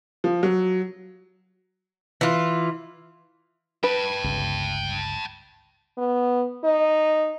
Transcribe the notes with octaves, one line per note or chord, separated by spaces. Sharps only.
F3
F#3
E3 F4
B4 G5 A5
G1 C#2
B3
D#4